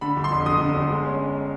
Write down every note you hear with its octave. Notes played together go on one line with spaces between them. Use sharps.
D3 B5
G1
C6
F2
G1 D#6
D3
G1
G#3
C#4